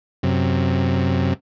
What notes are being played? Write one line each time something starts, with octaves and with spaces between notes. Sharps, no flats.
F#2 C3